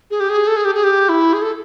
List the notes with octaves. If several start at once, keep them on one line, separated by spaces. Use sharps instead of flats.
G#4
G4
G#4
A4
G#4
G4
G#4
G4
E4
G#4
A4